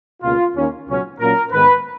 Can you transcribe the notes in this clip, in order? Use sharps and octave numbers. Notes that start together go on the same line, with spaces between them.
C#2 B2 A#3 F4
D#2 D#3 A#3 C#4
C#2 B2 F#3 C#4
A#2 F#3 A#3 C#4 A#4
G#2 D#3 G#3 B3 B4